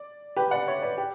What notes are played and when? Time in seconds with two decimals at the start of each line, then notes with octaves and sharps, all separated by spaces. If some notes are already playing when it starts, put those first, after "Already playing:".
Already playing: D5
0.36 G4 B4
0.51 D5 F#5
0.68 C#5 E5
0.82 B4 D5
0.98 G4